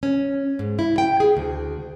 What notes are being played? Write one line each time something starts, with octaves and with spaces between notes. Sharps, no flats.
C#4
G#2
E4
G5
G#4
D2